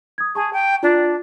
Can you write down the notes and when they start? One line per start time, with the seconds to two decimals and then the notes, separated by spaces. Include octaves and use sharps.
0.18 D#6 G#6
0.35 G#4 A5 C#6
0.53 G5
0.83 D4 F4